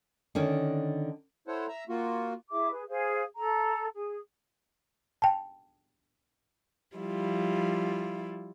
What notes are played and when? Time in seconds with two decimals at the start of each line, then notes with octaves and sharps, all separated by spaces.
0.35 D3 D#3 C#4
1.48 E4 A4 C5 C#5 F#5
1.68 E5 A#5
1.89 A#3 F4 F#4
2.51 E4 G#4 E5 D6
2.71 G#4 B4
2.88 G#4 C5 F5
3.36 A4 A#5
3.94 G#4
5.22 G5 A5
6.95 F3 G3 E4 F4